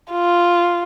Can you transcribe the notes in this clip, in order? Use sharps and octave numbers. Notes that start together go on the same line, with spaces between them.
F4